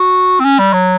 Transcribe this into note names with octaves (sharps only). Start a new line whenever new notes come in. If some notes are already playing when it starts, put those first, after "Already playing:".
Already playing: F#4
C4
C#4
G3
F#3